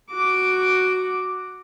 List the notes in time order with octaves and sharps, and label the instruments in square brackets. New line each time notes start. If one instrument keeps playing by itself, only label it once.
[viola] F#4 D6